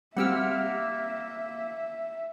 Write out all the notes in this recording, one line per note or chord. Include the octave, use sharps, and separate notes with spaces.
G3 A#3 C4 G4 E5 F#5 E6 F6